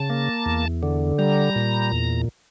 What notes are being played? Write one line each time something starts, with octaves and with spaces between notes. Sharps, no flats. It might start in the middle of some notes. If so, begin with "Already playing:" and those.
Already playing: C#3 A5
A#3
E2
D3
G3 A#5
A#2
E2